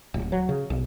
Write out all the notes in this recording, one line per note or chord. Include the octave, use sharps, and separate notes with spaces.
D1
F#3
C#3
B1